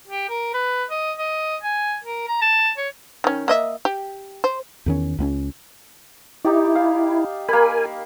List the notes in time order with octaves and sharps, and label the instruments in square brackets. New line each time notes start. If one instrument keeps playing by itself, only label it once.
[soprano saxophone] G4
A#4
B4
D#5
D#5
G#5
A#4
A#5
A5
C#5
[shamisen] D#3 C#4
A#3 D#5 E5
G4
C5
[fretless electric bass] E2 D#3 C#4
C#2 C4 C#4
[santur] D#4 G4 D5 [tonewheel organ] E4
[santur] F5
[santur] A#3 B5 [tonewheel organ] A#4 G#5